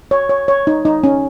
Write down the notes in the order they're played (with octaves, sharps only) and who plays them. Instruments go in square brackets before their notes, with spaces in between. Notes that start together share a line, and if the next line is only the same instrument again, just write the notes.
[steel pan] C#5
C#5
C#5
D#4
D#4
C#4